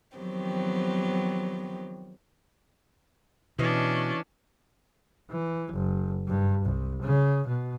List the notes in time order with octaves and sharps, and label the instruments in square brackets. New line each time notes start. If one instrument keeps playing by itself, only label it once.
[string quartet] D#3 F3 F#3 B3 C4 G4
[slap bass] B2 [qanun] E3 D#5 F5 [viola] C#4 D4
[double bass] E3
F#1
G2
C2
C#3
B2